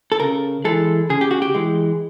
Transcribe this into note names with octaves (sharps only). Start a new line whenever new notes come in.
A4
C#3 A#4
E3 G#3 A4
C#3 G#4
G4
F#4
G4
E3 G#3